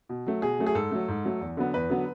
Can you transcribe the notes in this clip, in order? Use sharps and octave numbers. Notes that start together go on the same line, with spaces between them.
B2
F#3 A3
B2 G#4
F#3 A3
G#4
G#2 A4
F#3 A3
G#2
F#3 A3
E2
D3 F#3 B3
E2 B4
D3 F#3 B3